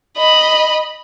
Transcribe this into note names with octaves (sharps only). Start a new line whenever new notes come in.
D#5 B5